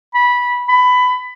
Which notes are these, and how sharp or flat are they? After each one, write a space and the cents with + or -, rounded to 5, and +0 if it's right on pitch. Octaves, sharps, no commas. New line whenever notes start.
B5 -15
B5 +15